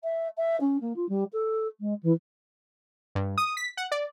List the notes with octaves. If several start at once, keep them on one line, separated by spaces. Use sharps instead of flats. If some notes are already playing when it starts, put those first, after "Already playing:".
E5
E5
C#4
A#3
F4
G3
A4
G#3
E3
G2
D#6
B6
F#5
D5